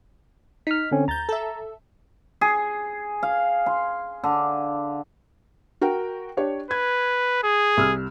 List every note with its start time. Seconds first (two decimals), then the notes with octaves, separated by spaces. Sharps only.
0.67 D#4 F6 B6
0.91 D3 C4 C#4
1.08 D2 A#5 G6 A6
1.29 A4 E5
2.41 G#4
3.23 F5
3.66 C6
4.24 D3
5.81 F#4 A#4 G5
6.37 D4 G4 C#5
6.71 B4 G#6
7.43 G#4
7.77 C2 E6 F6